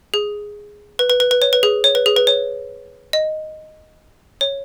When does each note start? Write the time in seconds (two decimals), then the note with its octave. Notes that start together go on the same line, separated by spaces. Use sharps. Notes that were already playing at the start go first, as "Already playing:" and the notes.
0.14 G#4
0.99 B4
1.10 B4
1.20 B4
1.31 B4
1.42 C#5
1.53 B4
1.63 G#4
1.84 C#5
1.95 B4
2.06 G#4
2.16 B4
2.27 C#5
3.13 D#5
4.41 C#5